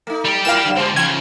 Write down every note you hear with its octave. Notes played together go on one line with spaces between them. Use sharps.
A3 D#4
G3 G4
A2 E4 A#4 F5 E7
C#3 F#3
G#2 D3 G4 C5
C#3 E3 F3 G#6